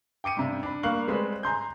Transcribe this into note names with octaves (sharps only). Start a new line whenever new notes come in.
G5 D6 C#7 D#7
G2 C3
D4 B5
G3 A#3 F5 C#6 F#6 F#7
G3 G#3 C4 B4
G#5 A#5 C6 G6